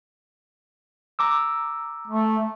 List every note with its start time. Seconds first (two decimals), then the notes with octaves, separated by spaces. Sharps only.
1.19 A#5 D6 E6
2.07 A3